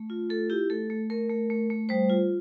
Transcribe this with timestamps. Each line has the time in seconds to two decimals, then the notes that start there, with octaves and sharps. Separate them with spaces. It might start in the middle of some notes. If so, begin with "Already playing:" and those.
Already playing: A3
0.10 F4
0.30 A3 A4
0.50 E4 G4
0.70 A3 A4
0.90 A3
1.10 A3 A#4
1.30 A3
1.50 A3
1.70 A3
1.89 G3 C5
2.10 F4